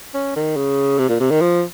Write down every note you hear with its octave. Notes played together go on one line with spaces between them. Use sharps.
C#4
D#3
C#3
C3
A#2
C3
D#3
F3